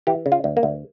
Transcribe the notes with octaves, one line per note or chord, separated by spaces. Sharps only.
E3 G4
C#3
F4
D2
A#3
D2